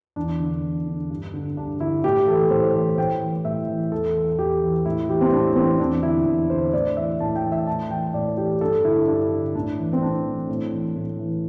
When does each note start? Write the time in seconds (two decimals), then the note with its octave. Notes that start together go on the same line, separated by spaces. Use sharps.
0.16 E2 D4
0.40 D3
0.64 E2
0.87 D3
1.10 G2
1.34 D3
1.57 G2 D4
1.80 D3 E4
2.04 A2 G4
2.27 E3 A4
2.51 A2 C5
2.74 E3 C5
2.98 A2 G5
3.21 E3
3.45 A2 E5
3.68 E3
3.92 E2 A4
4.15 E3
4.39 E2 G4
4.62 E3
4.85 A2 E4
5.09 E3 G4
5.21 C4
5.32 A2 D4
5.56 E3 C4
5.79 E2 D4
6.03 D3 E4
6.26 E2
6.50 D3 C5
6.73 A2 D5
6.97 E3 E5
7.20 A2 A5
7.36 G5
7.44 E3
7.52 E5
7.67 A2 A5
7.90 E3 G5
8.14 A2 D5
8.37 E3 G4
8.61 G2 A4
8.85 D3 E4
9.07 G2 D4
9.31 D3
9.55 A2 D4
9.79 E3
9.93 C4
10.02 A2 D4
10.25 E3
10.49 A2
10.72 E3
10.95 A2
11.19 E3